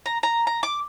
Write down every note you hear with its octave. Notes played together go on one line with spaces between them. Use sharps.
A#5
A#5
A#5
D6